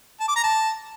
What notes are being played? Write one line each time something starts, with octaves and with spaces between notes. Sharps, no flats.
A5
D6
A#5
A5